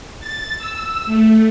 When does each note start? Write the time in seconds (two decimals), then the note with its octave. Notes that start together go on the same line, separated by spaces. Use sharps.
0.20 A6
0.58 E6
1.06 A3